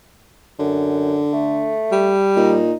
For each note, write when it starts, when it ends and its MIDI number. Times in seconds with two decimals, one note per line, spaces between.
0.59 1.21 42
0.59 1.72 50
1.33 2.13 57
1.92 2.61 55
2.36 2.74 46
2.36 2.75 63